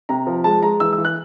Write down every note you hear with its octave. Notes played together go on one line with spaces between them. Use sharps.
C3 A#5
F3
G#3 A5
G#3 A#5
E3 E6
E6
E3
F#6